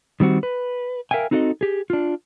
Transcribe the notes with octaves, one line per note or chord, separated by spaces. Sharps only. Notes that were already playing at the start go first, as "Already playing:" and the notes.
D#3 G3 C4 F#4
B4
A#4 E5 F5 G5 G#5
C4 D#4 F#4 A4 D5 D#5
G4 G#4
D4 F4